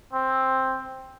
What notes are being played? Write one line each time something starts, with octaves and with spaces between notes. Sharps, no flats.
C4